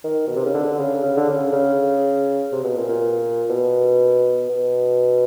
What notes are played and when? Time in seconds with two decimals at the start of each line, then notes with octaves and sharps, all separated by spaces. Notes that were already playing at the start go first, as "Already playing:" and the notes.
0.04 D#3
0.27 B2
0.36 C3
0.45 C#3
0.54 D3
0.79 C#3
1.03 C#3
1.17 D3
1.30 C#3
1.52 C#3
2.52 C3
2.64 B2
2.77 A#2
2.89 A#2
3.50 B2
4.49 B2